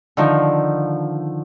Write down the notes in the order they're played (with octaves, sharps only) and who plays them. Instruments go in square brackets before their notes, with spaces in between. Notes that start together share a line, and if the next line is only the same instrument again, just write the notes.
[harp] D3 D#3 F3